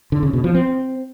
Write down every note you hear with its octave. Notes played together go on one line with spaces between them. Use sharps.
D3
C#3
B2
F3
C4